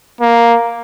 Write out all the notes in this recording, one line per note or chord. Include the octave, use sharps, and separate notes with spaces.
A#3